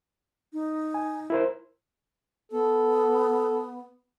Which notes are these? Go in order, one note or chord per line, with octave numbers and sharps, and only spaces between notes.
D#4
G#5
E4 A#4 C5
B3 A4